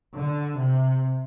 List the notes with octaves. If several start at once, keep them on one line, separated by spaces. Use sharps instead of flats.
D3
C3